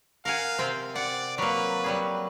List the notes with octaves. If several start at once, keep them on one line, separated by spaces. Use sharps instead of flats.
A#4 F5 F#5 G#5
C3 C4 G5
D5 F#5
F#3 A#3 B4
F#3 G3 G#4